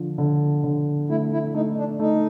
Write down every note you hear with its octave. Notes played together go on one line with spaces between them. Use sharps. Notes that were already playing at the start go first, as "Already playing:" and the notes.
Already playing: D3 F3
D3
D3
A3 E4
E4
A3 D#4
D4
A3 D#4